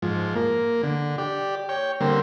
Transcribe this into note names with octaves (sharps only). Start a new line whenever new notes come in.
G#2 F3
A#3
D3
G4 D5
C#5 G5
D3 G3 A#3 C4